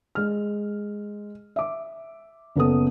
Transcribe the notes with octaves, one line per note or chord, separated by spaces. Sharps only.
G#3 F6
E5 D6
F#1 B3 A4 D#6